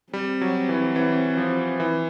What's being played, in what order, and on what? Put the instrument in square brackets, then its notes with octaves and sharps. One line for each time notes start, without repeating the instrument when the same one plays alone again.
[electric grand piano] G3 [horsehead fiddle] C4
[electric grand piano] F#3
E3
E3
F3
E3